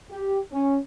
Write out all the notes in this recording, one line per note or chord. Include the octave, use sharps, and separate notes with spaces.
G4
C#4